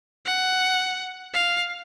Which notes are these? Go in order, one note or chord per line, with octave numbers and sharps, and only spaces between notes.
F#5
F5